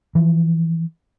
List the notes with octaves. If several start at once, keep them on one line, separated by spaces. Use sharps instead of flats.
E3 F3